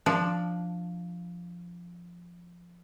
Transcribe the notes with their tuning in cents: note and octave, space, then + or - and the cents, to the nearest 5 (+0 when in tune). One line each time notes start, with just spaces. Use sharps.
F3 +0 D4 +0